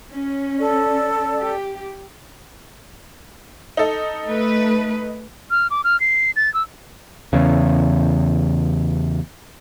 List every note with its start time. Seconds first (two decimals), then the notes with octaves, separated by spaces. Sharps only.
0.12 C#4
0.59 A4 D5
1.37 G4
3.77 D#4 A4
4.28 A3 B4
5.51 F6
5.71 D6
5.84 F6
6.00 C7
6.36 A6
6.54 E6
7.33 E2 C#3